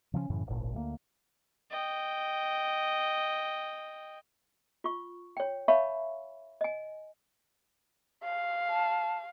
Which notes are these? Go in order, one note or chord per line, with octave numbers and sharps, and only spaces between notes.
C#3 F3 C4 C#4
F#2 A2 C#3 E3
D1 G#1 A#2
D2 G2 A#3
D#5 G5
F4 C#6
C#5 G5
C#5 E5 F5 A5 B5 C#6
D#5 G#5
F5
A5